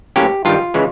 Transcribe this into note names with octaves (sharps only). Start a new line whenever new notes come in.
A2 F#3 A#3 C#4 G4
G2 D#3 G3 F4
C#3 E3 G#3